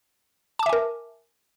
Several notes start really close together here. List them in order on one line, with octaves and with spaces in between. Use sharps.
A5 D6 E5 G#5 A#4